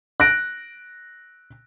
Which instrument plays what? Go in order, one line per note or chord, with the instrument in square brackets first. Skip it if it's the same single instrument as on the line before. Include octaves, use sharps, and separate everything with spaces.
[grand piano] F#6 A#6 D7